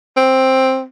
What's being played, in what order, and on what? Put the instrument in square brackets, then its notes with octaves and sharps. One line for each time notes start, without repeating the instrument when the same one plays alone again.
[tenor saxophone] C4